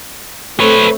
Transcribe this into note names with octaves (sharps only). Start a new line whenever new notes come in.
A3 C4 B4 C#5